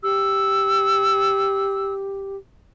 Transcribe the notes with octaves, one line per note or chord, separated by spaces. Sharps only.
G4 E6